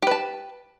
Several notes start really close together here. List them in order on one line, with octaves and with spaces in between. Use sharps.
G4 B4 A5